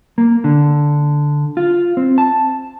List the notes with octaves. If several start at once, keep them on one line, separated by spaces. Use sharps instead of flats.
A#3
D3
F4
C4
A5